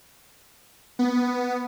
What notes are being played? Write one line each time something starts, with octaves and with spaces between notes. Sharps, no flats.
B3